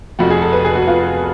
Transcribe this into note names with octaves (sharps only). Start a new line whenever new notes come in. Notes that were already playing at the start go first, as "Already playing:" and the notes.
F1 F2 F3 F#4
G#4
A4
B4
G#4
F#4
F4